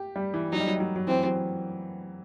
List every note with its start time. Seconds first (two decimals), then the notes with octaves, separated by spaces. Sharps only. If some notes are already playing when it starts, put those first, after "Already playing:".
Already playing: G4
0.16 G3
0.34 E3
0.53 F#3 D#4
0.60 G3
0.67 F#3
0.76 G3
0.80 F#3
0.96 F#3
1.07 E3 C4
1.26 F#3